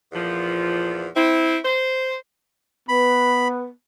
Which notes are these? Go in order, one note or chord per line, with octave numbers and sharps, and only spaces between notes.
E2 A#2 F3
C4 E4
C5
B3 B4 B5